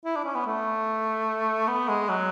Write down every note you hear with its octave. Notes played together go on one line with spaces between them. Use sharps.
E4
D4
C#4
B3
A3
B3
G#3
F#3